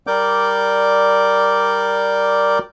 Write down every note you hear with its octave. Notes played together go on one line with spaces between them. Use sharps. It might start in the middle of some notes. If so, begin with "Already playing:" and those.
G3 A#4 D5 D6 G6